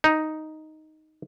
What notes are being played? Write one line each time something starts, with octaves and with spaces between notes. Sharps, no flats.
D#4